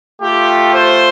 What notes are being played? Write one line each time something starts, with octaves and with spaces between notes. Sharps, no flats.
A3 F4 G4
C5